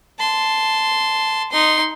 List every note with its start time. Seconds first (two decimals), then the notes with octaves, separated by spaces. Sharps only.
0.19 A5 C6
1.52 D#4 C6